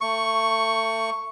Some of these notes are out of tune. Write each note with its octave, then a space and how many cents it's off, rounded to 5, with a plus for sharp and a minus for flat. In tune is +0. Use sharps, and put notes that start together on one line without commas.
A3 +30 C#6 +0